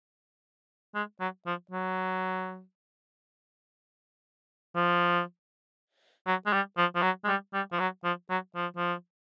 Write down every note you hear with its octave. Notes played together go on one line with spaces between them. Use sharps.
G#3
F#3
F3
F#3
F3
F#3
G#3
G3
F3
F3
F#3
G#3
G3
G3
F3
F#3
F3
F#3
F3
F3